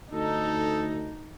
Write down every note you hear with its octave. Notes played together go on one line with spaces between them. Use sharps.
D2 D#4 A4